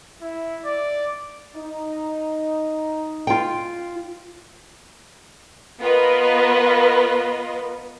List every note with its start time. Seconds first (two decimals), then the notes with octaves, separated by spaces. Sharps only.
0.22 E4
0.65 D5
1.55 D#4
3.27 F4 G5
5.81 B3 F4 A#4 B4 D#5